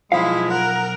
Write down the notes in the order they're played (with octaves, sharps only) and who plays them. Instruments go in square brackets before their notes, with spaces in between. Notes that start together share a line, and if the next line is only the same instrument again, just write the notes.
[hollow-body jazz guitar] B1 F5 [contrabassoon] F3 [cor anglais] G#3 [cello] E4
[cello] A#4 [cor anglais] F#5